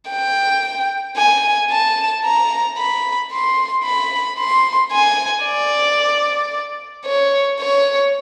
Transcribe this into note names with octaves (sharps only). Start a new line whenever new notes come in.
G5
G#5
A5
A#5
B5
C6
B5
C6
G#5
D5
C#5
C#5